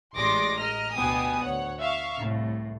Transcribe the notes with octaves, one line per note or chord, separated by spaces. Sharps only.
A1 G#3 D5 C6 D6 A#6
A#4 D#5 F6
D2 B2 B3 G4 G#5 D#6
D2 C#5 F#5
E5 F5 C#6
C2 A2